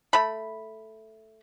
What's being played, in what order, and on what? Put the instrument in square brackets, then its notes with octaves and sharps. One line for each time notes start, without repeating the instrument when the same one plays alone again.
[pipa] A3 B5